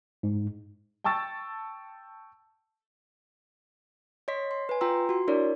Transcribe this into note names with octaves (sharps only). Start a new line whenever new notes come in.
G#2
G5 A5 C#6 E6 A6
C#5 D#5 C6 B6
C6
B4 G#5
F4 G5 A#5 C6 E6
F#4 C6
D4 E4 A#4 C#5 D5